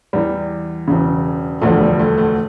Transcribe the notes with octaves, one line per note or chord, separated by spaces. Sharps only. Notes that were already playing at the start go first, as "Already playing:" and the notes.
E2 E3 G3
E1 E2 C#3
E1 D2 D3 F3 A3
G3
A3
A3